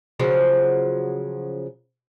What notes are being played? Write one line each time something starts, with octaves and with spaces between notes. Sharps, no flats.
C#3 F3 F#3